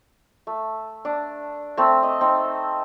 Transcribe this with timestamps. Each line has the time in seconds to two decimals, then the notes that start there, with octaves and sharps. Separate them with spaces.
0.47 A3
1.05 D4
1.77 A3 C4
2.03 D#5
2.21 C4 D#4